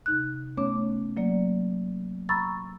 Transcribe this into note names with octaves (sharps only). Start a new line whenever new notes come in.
C3 D#4 F#6
A3 B3 C#4 C#5 D6
F#3 A#3 D5
A#5 B5 C#6 E6 A6